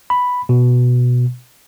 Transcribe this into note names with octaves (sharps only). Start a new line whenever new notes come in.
B5
B2